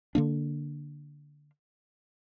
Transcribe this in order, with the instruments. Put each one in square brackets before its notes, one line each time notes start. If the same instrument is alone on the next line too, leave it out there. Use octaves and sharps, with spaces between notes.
[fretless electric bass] D3 A#3 D4